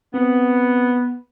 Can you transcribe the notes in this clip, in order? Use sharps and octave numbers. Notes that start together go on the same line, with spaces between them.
B3 C4